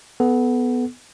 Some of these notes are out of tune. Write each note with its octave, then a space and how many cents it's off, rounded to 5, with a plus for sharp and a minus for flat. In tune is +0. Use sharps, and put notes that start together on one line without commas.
B3 +5 A4 -25